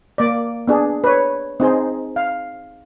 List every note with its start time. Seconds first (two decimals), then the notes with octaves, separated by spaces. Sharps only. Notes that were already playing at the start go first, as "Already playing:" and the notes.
0.18 A#3 D5
0.68 B3 D4 G#4
1.04 B4 C#5
1.60 C4 D#4 G#4 C5
2.16 F5